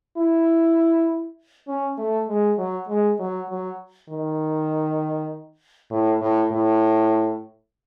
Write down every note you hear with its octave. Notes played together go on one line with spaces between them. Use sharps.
E4
C#4
A3
G#3
F#3
G#3
F#3
F#3
D#3
A2
A2
A2